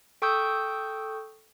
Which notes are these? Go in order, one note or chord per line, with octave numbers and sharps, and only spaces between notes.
A4 G5 C#6 D#6 E6 G6